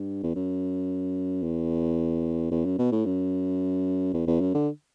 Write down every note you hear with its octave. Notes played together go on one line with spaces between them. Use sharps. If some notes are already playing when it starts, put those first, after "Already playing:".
Already playing: G2
E2
F#2
E2
E2
F#2
B2
A2
F#2
E2
E2
F#2
D3